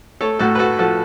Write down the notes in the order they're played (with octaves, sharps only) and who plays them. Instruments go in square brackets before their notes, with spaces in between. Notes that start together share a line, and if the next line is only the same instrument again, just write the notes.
[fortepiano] A3 A4 C#5
A2 F#4 A4
B4
A3 F#4 A4
F3 F#4 A4